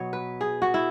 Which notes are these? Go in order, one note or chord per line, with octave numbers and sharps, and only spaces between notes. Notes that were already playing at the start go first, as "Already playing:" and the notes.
Already playing: B2 F#3 B3 C#5
B4
G#4
F#4
E4